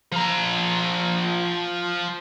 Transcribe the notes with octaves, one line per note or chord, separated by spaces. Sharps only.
F3 A#5